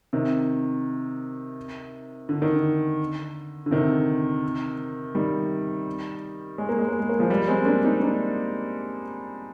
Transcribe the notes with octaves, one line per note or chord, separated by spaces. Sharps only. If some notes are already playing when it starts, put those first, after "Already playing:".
C3 D#3
D3
D#3
D3
D3
C3 D#3
D#3 G3
G#3
A#3
G#3
A#3
G#3
A#3
F3 G#3
G3 A#3
G#3 C4
A#3 D4
C4 D#4
A#3 D4